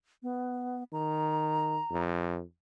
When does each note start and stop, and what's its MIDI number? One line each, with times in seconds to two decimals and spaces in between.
0.23 0.84 59
0.93 1.79 51
0.93 2.02 82
1.91 2.42 41